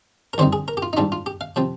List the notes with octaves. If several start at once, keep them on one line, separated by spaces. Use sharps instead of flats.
A#4
F2 D3 G3 C4 D#4 C5
G#4
A#4
G4
F4
D#4
G#2 G3 D4 F4
F4
G4
F5
C3 F3 C4